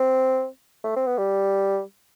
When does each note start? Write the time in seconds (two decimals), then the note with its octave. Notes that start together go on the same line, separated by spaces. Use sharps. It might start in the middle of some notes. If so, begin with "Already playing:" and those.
Already playing: C4
0.84 A3
0.96 C4
1.07 B3
1.18 G3